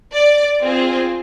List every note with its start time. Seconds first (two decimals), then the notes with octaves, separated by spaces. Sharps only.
0.14 D5
0.63 C4 F4 G#4